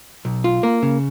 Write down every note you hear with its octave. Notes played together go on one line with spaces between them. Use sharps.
B1
F4
A#3
C#3